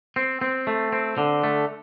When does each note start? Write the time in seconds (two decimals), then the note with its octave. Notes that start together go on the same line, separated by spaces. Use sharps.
0.16 C4
0.42 C4
0.67 A3
0.92 C4
1.18 D3
1.43 A3